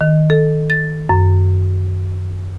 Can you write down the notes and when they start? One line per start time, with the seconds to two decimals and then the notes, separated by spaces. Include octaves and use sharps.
0.01 D#3
0.30 A4
0.70 A6
1.09 F#2